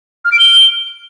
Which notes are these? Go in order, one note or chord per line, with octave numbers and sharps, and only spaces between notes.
F6
D7
G7